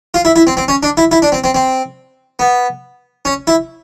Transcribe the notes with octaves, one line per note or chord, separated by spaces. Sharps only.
F4
E4
E4
C4
C4
C#4
D4
E4
E4
D4
C4
C4
C4
B3
C#4
E4